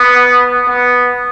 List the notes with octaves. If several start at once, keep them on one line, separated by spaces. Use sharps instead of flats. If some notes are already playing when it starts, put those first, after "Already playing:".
Already playing: B3
B3